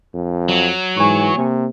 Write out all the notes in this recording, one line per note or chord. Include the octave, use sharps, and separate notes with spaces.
F2
F#3
G#2 E3 G#5 C#6
C3 A#3